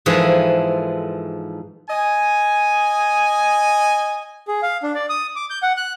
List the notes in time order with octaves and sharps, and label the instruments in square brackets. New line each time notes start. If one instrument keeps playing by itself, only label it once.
[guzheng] G#2 E3 F3 G#4 A4
[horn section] D#5 G#5
[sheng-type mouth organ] G#4
F5
D4
D5
D#6
D6
G6
F#5
F#6